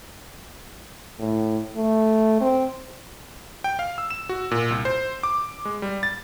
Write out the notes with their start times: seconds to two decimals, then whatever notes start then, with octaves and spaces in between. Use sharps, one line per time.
1.19 A2
1.76 A3
2.41 C4
3.64 G5
3.79 F5
3.98 E6
4.10 E7
4.29 F#4
4.51 A#2
4.71 C2
4.85 C5
5.23 D6
5.65 G#3
5.82 G3
6.03 A6